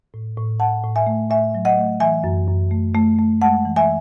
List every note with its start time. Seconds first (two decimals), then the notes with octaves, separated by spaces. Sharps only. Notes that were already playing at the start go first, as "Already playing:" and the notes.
0.14 A2
0.37 A2
0.60 A2 F#5 A5
0.84 A2
0.96 E5 G#5
1.07 A3
1.30 A2 E5 G#5
1.55 F#3
1.65 D#5 F#5
1.78 A3
2.00 E3 E5 G#5
2.24 F#2
2.48 F#2
2.71 A3
2.95 A3
3.19 A3
3.42 G#3 F#5 A5
3.65 E3
3.76 E5 G#5